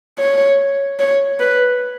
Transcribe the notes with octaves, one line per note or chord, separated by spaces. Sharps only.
C#5
C#5
B4